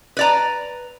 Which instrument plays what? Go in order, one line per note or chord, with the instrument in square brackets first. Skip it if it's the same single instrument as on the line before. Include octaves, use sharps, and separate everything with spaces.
[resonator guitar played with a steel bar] B4 D5 A#5